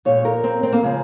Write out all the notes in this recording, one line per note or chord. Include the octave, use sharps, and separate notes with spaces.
A#2 F3 G#3 C#5
A#4
C4
C4
A#3
C#3 F3 G#3